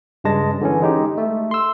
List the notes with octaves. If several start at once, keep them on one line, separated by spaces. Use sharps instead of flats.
G2 C#3 G3 G#3 A5 A#6
D3 E3 G#3 C#4
G#3 D#4 G4
A3
C6 E6